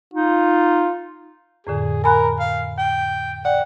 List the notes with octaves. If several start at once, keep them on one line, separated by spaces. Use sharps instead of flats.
D#4 F4
F2 A2 D3 G#4
A#4 G#5 B5 F#6
F5
G5
D5 F#5 G5